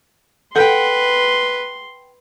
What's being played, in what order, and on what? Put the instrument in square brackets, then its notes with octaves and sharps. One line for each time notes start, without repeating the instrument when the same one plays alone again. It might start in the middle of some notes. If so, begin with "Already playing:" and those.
[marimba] A4 G6 [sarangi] B4 [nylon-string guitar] F#5 G5 [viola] C6